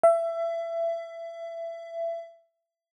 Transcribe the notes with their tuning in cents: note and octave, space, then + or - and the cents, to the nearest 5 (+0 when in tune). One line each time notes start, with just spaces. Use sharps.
E5 +25